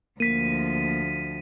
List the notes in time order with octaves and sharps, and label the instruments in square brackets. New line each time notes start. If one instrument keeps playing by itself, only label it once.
[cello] D2 F3 [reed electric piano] A#3 [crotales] B6 D#7